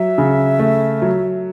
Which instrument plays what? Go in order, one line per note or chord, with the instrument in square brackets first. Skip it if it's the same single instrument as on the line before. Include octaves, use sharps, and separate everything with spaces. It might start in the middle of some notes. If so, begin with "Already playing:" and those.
Already playing: [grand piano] F#3 [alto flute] E5
[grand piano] C#3
A3
F#3